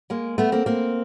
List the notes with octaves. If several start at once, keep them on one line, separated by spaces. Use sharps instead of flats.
G#3 A#3
A3 B3
A#3 C4
A#3 C4